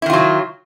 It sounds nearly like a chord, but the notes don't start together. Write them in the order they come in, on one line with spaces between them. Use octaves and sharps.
E4 D#3 F4 F#3